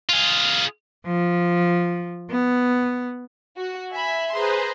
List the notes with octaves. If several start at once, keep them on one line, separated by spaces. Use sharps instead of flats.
F4 G#4
F3
B3
F#4
E5 G#5 B5
G#4 B4 C5 A#5 C6